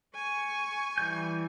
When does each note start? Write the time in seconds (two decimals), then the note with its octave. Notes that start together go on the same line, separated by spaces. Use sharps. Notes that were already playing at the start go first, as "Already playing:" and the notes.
0.15 G#5 C#6
0.98 E3 G3 G6